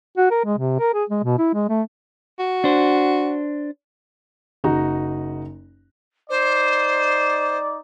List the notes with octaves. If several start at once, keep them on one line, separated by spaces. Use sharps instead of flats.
F#4
A#4
G#3
C3
A#4
G#4
G#3
B2
E4
G#3
A3
F#4
D4 C5
F#1 D#4 F#4 A#5
D#4 C5 D5